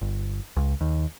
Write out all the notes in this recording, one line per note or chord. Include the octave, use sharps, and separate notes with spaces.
G1
C#2
D#2